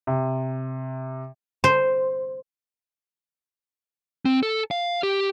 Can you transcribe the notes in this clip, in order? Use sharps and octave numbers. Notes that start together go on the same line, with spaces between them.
C3
C5
C4
A4
F5
G4